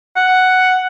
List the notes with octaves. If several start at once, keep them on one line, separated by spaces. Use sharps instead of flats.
F#5